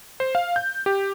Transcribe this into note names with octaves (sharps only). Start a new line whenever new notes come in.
C5
F5
G6
G4